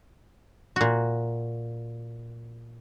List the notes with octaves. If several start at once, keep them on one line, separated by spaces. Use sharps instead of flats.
A#2 F#4